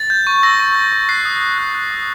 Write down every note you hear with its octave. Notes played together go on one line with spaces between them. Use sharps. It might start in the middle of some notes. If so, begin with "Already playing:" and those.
Already playing: A6
G6
C#6
E6 A#6
C#6
G6
C#6
F#6 C7
D#6
D#6
F#6
F#6
D#6